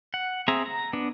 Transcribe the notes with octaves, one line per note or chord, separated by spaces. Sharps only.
F#5
C4 G#4 E5 A#5
A#5
B3 D4